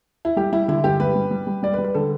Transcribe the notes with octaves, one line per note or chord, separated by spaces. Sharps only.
E4
G3 G4
G3 E4
D3 E4
G2 G4
G3 B4
G3
G3
G3
G3 D5
B4
G3
B4
D3 A4